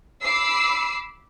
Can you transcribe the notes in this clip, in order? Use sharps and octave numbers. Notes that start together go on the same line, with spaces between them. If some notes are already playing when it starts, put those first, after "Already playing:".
B5 D6 E6 C7